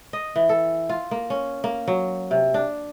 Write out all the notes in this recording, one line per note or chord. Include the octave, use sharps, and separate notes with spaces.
D#5
E3
A4
F4
A#3
C#4
A#3
F#3
C3
D4